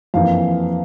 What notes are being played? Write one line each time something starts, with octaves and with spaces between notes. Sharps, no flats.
F2 E3 A#3 F5